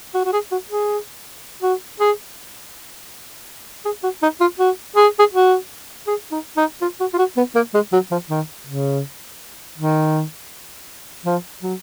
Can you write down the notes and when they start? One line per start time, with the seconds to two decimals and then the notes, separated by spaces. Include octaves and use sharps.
0.14 F#4
0.25 F#4
0.33 G#4
0.51 F#4
0.70 G#4
1.62 F#4
2.00 G#4
3.85 G#4
4.03 F#4
4.22 D#4
4.40 F4
4.59 F#4
4.96 G#4
5.19 G#4
5.33 F#4
6.07 G#4
6.31 D#4
6.57 D#4
6.81 F4
7.00 F#4
7.13 F4
7.18 F#4
7.37 B3
7.55 A#3
7.74 G#3
7.92 F#3
8.11 F3
8.30 D#3
8.67 C#3
9.78 D#3
11.25 F3
11.63 F#3